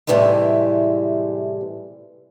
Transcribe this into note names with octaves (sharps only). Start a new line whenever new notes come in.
A2 C3 E3 G3 G#3